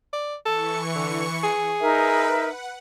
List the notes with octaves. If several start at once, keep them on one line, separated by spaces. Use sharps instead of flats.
D5
E3 A4 C#6 C#7
D3
G#4
D#4 A#4 B4 E5
F#5